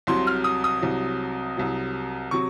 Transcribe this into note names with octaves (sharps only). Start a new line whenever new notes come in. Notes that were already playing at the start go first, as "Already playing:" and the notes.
C2 C3 F#3 C6
F6
D#6
D#6
C2 C3 F#3
C2 C3 F#3
C3 F#3 C#6